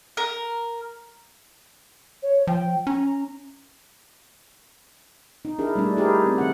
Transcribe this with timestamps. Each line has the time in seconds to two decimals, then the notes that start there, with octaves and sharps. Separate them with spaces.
0.17 A#4
2.22 C#5
2.47 F3 G5
2.87 C#4 A#5
5.45 D#4
5.59 D4 E4 G#4 A#4
5.75 G3 A3 D4
5.97 D#4 E4 G4 G#4 A#4 B4
6.26 C4
6.38 D#3 F#5